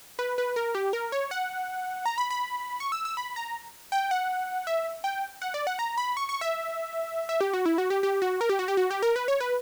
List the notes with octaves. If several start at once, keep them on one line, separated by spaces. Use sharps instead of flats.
B4
B4
A#4
G4
A#4
C#5
F#5
A#5
B5
B5
C#6
E6
E6
B5
A#5
G5
F#5
E5
G5
F#5
D5
F#5
A#5
B5
C#6
C#6
E5
E5
G4
F#4
E4
F#4
G4
G4
F#4
A#4
G4
F#4
G4
F#4
G4
A#4
B4
C#5
B4